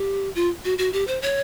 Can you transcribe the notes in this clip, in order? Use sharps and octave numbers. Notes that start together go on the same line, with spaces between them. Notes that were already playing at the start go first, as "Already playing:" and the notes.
Already playing: G4
F4
F#4
F#4
G4
C5
C#5